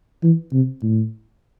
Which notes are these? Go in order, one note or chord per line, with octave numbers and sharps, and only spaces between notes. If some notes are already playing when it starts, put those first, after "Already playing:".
E3
C3
A2